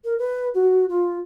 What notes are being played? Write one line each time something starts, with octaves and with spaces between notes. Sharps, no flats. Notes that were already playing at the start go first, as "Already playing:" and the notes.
A#4
B4
F#4
F4